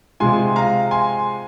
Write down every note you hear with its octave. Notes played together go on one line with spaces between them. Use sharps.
C3 G#3 F4 G#5 C6
F5 A#5
G#5 C6